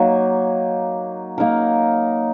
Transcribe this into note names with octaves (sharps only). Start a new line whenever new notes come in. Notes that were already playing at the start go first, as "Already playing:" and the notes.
Already playing: F#3 A#3 D#4
A#3 D#4 A#4